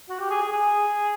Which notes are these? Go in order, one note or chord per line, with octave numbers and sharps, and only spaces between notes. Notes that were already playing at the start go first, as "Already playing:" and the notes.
F#4
G4
G#4
G#4
G#4